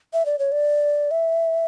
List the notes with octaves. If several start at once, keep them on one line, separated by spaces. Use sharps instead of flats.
E5
D5
C#5
D5
E5